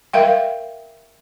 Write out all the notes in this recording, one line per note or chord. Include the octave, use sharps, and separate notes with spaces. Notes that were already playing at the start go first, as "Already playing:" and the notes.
A#4 E5 F5 G5